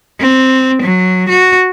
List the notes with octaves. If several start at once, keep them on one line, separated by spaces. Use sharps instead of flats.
C4
F#3
F#4